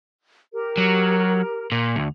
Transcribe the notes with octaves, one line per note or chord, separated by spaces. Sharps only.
G4 A#4
F#3
A#2
D2